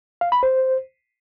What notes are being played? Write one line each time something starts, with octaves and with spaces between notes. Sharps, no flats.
F5
B5
C5